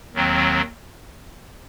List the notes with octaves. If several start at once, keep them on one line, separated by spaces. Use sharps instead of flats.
D#2 D#3 F#3 C4